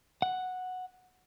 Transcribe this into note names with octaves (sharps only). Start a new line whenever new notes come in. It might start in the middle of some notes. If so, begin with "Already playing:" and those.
F#5